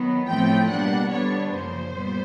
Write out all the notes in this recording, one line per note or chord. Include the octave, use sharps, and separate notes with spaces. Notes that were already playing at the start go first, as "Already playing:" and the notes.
Already playing: D#3 F#3 B3
A2 F3 A3 C4 G5
B2 G3 A#3 D4 F#5
D3 G3 B3 D4 C#5
F#2 C#3 F3 A#3 C5
A#2 G3 B3